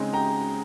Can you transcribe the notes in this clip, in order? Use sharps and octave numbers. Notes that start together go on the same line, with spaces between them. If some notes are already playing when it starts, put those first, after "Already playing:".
Already playing: C#3 G#3 C4 D#4 G#5
G5 A#5